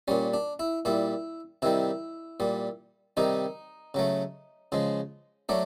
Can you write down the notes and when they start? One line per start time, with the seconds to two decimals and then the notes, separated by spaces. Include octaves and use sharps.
0.08 A#2 G3 C#4
0.34 D4
0.59 E4
0.85 A#2 G3 E4
1.62 C3 D#3 G3 E4
2.40 A#2 G3
3.17 C3 D#3 G3 D#4
3.94 C#3 F#3 A3
4.72 C#3 F3 G#3
5.49 F#3 A3 D4